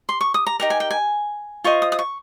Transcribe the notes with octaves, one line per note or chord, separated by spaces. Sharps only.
C6
C#6
D#6
A#5
D#4 G4 A#4 A#5
G#5
G5
G#5
F4 C5 D#5 C#6
D#6
D#6
C#6